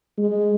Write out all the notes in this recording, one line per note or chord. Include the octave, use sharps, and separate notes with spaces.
G#3